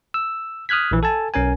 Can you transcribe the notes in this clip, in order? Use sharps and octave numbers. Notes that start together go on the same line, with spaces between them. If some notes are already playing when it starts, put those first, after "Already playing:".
E6
D#6 F6 F#6 G#6 B6
A#1 E3
A4 G#5 A5
B1 C#4 A#4 G#5